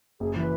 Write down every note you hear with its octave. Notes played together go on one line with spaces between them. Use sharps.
F#1 G#4
E3 B4